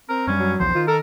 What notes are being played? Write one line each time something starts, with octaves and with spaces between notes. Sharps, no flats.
C4 A#4
F#2 G3 C#4
F#3
B1 E2 F3 C5
D#3 F4
A4 A#4